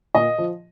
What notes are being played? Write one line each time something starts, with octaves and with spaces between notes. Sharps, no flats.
A#2 D#5
F3